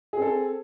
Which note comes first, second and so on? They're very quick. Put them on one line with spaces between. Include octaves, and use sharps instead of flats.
G#4 C4 A4